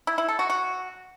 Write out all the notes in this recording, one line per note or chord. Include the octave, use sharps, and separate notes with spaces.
E4
E4
A4
F#4
F#4